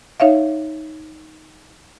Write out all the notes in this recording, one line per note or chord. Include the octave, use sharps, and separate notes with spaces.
D#4 C#5 E5 F5